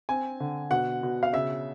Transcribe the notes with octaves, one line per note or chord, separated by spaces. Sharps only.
C4 G#5
D3
B2 F#5
B2
F5
C#3 E5